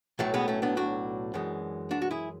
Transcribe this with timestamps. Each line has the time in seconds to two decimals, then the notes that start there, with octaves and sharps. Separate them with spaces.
0.19 B1 A2 F#3 A3
0.34 G#3 B3
0.48 A3 C#4
0.62 B3 D4
0.77 D4 F#4
1.34 F#2 E3 G#3
1.91 D4 F#4
2.02 F#4
2.11 E4 G#4